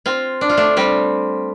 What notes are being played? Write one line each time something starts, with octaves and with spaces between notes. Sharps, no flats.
C4 F4
D4
F4
A3 D4
G3 C4